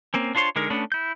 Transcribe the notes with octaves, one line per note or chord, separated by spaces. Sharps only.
A#3 C4 C#4
D4 F4 C5 C#5 C6
D3 G#3 D#4 A#4
A3 B3 C#4 D4
E4 G6